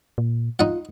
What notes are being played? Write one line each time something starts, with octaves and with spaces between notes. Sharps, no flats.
A#2
D#4 F4 F#5